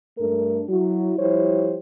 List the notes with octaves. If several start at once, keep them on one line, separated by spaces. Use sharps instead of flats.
G2 A3 D4 A4 A#4
F#3 E4 F#4
F3 G3 E4 G4 C5 C#5